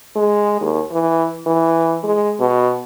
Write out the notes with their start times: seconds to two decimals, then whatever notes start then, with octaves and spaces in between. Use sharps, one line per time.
0.16 G#3
0.61 D#2
0.92 E3
1.47 E3
2.04 G#3
2.40 B2